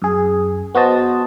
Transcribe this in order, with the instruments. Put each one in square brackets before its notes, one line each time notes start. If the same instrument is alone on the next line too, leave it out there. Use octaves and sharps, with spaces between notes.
[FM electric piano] F#2 G#4
B3 F#4 C5 D#5 A5